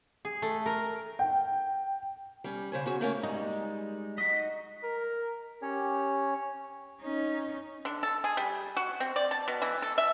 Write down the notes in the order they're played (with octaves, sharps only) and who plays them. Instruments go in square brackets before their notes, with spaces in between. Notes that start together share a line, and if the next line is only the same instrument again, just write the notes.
[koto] G#4
A3
A#4
[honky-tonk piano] G5
[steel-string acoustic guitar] G3 C#4
C#3 C5 G#5
C#4 F#4 G#4
A3 A#3 C#4 C#5
[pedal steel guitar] G3 G#3 D#4
[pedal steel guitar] D#4 F#4 D#5 [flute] B6
[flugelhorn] A#4
[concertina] C#4 C#5 [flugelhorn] G4
[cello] C#4 D#4
[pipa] D3
A4
G#4
G3
F#4
C4
D5
A5
B2
E3
A4
E5